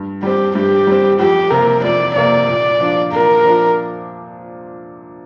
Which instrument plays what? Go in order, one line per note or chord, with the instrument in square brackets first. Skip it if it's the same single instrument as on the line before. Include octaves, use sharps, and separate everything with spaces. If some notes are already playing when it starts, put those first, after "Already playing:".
Already playing: [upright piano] G2
[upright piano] G3 C4 [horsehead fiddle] G4
[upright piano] G2 [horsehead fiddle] G4
[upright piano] G3 C4
[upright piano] F2 [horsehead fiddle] G4
[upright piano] C3 A#3 [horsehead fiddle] A#4
[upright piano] F2 [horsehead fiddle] D5
[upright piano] C3 A#3 [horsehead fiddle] D5
[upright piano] A#2
F3 D4 F4
[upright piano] A#2 [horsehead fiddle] A#4
[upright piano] F3 D4 F4